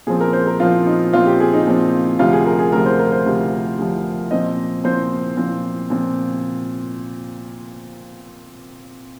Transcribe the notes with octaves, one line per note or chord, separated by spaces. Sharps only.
A#2 F3 C4 G#4
A#4
C5
A#4
A#2 F3 C4 F4
D#4
A#2 F3 C4 F4
G4
G#4
D#4
A#2 F3 C4
D2 C3 F3 F4
G#4
A#4
G#4
D2 C3 F3 A#4
C5
A#4
C5
D2 C3 F3
D2 C3 F3
A#2 F3 C4 D#5
A#2 F3 C4 C5
A#2 F3 C4
A#2 F3 C4